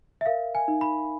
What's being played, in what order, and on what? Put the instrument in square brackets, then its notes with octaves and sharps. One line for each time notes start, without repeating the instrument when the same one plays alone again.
[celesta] E5
A#4 F5
G#5
D#4
B5